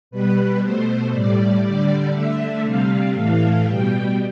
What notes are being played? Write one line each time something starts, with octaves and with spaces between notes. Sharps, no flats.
B2 G3 B4
B2 A3 C5
A2 G3 D5
D3 G3 D5
D3 A3 E5
C3 G3 F5
A2 E3 A3 F5
B2 G3 G5